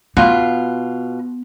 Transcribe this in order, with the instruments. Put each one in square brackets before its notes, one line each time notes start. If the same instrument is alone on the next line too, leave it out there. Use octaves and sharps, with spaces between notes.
[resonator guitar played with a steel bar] B2 F4 [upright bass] B3